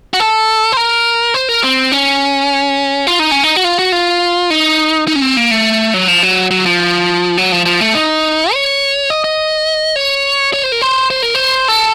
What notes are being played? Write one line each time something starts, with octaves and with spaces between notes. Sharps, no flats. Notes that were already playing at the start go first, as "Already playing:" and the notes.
F#4
A4
C5
A#4
C5
A#4
C4
C#4
F4
D#4
C#4
D#4
F#4
F4
F#4
F4
D#4
D#4
C#4
C4
A#3
A3
F#3
F3
F#3
F#3
F3
F#3
F3
F3
A3
D#4
C#5
D#5
D#5
C#5
C#5
C5
A#4
C5
C5
A#4
C5
A4